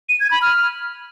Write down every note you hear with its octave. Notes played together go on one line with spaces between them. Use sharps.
D#7
G#6
B5
F6